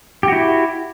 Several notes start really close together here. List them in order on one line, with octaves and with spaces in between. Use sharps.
G4 F#4 E4